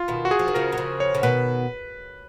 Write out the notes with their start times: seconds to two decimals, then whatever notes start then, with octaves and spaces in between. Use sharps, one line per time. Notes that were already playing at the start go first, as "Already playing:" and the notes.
Already playing: F4
0.08 B2 D#3
0.25 F#4
0.31 F#3 G#4
0.39 F3
0.48 D#3
0.54 C#3 F3 A#4
0.72 F#3
0.78 C#3 F3
1.00 C#5
1.15 C#3
1.23 B2 D#3 B4